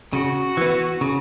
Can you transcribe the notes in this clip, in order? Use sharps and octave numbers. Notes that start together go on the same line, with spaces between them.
C#3 F#4
E3 B3
C#3